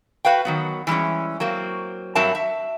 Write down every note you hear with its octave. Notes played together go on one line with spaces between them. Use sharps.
F#4 B4 F5 G5
D#3 F#3 B3
E3 G3 G#3 C#4
F#3 A#3 C4
G2 F#3 C4 A#4 E5 A5
E5